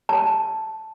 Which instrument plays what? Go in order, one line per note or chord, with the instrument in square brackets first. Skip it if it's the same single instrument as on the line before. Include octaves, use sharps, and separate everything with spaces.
[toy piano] A5